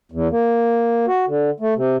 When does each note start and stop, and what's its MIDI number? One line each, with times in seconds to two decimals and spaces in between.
0.12 0.28 40
0.31 1.06 58
1.07 1.25 66
1.27 1.50 50
1.60 1.74 57
1.76 1.96 48